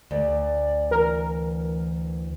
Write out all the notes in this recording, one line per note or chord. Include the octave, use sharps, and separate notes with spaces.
D2 D5
E3 A#4